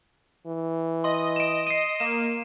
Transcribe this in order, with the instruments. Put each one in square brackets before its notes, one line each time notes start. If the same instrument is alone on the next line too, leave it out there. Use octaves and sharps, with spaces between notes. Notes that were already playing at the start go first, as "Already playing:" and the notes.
[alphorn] E3
[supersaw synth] D#5 [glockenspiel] C6
[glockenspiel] D7 E7
C7 D#7
[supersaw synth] A#3 [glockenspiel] E7